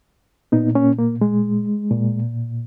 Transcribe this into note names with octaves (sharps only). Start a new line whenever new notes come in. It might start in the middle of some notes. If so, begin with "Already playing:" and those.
A#2 B3 D#4
A#3 C#4
A#3
G#3
A#2